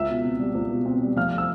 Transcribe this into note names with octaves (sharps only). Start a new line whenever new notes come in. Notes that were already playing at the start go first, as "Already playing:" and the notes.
Already playing: C#2 E5 E6
B2
C4
G3
C#2
B2
C4
G3
F1 F5 F6
E6